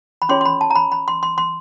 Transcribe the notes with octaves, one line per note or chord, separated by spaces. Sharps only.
B5
C#4 F4 G#4 C#5 C6
C6
B5
A5
A#5
B5
B5
C6
C6
C6